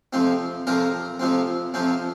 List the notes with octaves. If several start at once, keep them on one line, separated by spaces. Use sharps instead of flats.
F2 C3 F3 C4
F2 C3 F3 C4 A#4
F2 C3 F3 C4
F2 C3 F3 C4